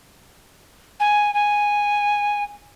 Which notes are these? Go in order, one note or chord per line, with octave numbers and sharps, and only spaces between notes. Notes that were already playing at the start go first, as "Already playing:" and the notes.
G#5
G#5